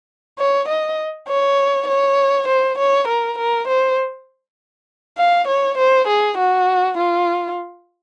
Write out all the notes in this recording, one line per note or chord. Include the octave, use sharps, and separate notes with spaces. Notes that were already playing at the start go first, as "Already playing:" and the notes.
C#5
D#5
C#5
C#5
C5
C#5
A#4
A#4
C5
F5
C#5
C5
G#4
F#4
F4